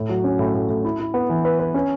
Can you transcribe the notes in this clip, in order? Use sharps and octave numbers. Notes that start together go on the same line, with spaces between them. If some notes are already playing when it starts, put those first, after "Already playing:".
Already playing: A2
F#3
C#4
A2
A2
A2
E4
E4
B3
E3
B4
B4
C#4